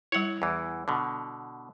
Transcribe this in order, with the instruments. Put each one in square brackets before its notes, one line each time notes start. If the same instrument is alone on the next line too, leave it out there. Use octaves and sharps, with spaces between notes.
[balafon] G3 E4 [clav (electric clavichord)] C#5 F#5
[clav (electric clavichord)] E2 E3
B2 D3